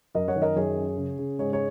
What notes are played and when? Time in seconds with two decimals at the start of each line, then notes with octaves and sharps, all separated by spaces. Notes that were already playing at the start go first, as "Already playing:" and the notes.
0.15 F#2 A#4 D#5
0.28 C#5 F#5
0.36 D#3
0.42 A#4 D#5
0.56 F#2 G#4 C#5
0.77 C#4
0.97 C#3
1.19 C#3
1.39 G#2 G#4 C#5
1.53 G#4 C#5